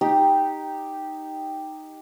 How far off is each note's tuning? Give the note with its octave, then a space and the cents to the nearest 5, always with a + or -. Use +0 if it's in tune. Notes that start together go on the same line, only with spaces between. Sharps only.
D#4 +0 G4 +0